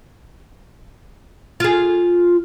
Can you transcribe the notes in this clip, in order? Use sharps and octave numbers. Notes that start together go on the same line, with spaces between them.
F4 G#4